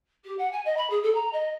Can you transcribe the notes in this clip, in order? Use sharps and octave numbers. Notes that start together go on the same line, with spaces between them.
G4
F#5
G#5
D#5
B5
G#4
A4
A#5
D#5